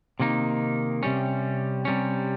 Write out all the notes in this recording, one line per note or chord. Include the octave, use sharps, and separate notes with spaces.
C3 D#3 A#3 D#4
C3 G3 C#4
C3 G3 C#4